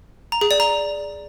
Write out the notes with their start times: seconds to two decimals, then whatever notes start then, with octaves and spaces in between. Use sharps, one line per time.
0.32 A#5
0.41 G#4
0.51 D5
0.60 A#5